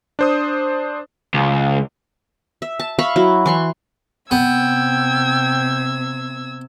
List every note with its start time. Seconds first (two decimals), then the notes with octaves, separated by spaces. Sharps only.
0.19 D4 C5 D#6
1.34 C#2
2.62 E5
2.80 A5
2.99 E5 F5 B5 C#6
3.16 F#3 E4
3.46 E3 C6 C#6
4.31 C3 B3 G5 E6 G#6